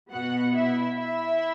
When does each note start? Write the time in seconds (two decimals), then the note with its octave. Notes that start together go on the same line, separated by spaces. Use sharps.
0.11 B2 B3 F#4 F#5
0.54 E4 E5
0.97 E4 E5